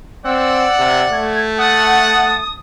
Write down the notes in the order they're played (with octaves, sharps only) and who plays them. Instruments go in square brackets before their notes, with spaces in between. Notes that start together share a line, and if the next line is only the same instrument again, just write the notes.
[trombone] C4 [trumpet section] D5 F#5 [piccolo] E6
[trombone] C3
[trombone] A3 [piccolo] G#6
[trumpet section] F#5 [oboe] A5 [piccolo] D#6